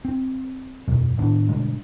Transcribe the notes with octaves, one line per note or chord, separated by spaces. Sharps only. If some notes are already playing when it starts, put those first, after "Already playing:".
C4
E1 F#2 B2 F#3
A2 D#3 B3 D4
G2 B2 D3 G#3